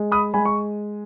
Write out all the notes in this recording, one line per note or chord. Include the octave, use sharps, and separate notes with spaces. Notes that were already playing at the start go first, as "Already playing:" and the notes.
Already playing: G#3
B5 D#6
G#3 G#5 B5
C#6